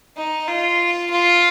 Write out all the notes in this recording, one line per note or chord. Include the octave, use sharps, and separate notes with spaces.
D#4
F4
F4